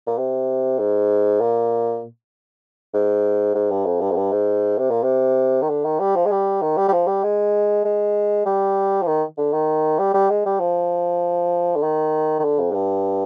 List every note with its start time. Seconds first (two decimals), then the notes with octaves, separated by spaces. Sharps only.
0.07 A#2
0.18 C3
0.79 G#2
1.41 A#2
2.94 G#2
3.55 G#2
3.71 G2
3.86 F2
4.01 G2
4.11 F2
4.16 G2
4.32 G#2
4.78 C3
4.90 A#2
5.03 C3
5.62 D#3
5.69 D3
5.85 D#3
6.00 G3
6.16 F3
6.26 G#3
6.31 G3
6.62 D#3
6.77 G3
6.88 G3
6.93 F3
7.07 G3
7.23 G#3
7.85 G#3
8.46 G3
9.02 F3
9.07 D#3
9.38 D3
9.53 D#3
9.99 G3
10.14 G3
10.30 G#3
10.45 G3
10.60 F3
11.76 D3
11.83 D#3
12.39 D#3
12.44 D3
12.59 F2
12.71 G#2
12.75 G2